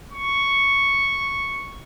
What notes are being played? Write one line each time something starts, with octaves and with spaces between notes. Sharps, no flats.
C#6